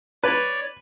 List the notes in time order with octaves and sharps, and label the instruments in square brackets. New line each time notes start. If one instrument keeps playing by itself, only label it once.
[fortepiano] B4 [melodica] C#5 D5